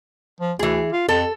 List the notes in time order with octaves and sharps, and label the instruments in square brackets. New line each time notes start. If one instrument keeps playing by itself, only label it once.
[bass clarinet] F3
[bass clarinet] D2 [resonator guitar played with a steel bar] E3 G#4
[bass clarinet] F4
[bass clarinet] F2 [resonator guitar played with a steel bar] A4